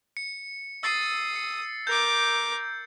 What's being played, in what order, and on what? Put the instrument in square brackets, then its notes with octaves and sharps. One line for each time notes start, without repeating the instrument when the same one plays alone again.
[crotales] C#7
[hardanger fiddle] D#6 [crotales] E6 A6 C7
[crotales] C#7
[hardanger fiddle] A#4 D6 [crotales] G6